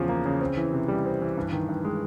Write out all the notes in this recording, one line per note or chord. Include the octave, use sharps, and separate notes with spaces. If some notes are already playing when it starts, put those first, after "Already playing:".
Already playing: E2 C#3 F3
A#3
C#3
C4
E3
C3
G3
C4
E3
G2
D#3
G2
G#3